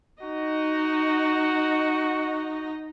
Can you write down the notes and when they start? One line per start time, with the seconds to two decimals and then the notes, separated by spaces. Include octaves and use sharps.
0.22 D#4 F#4 D#5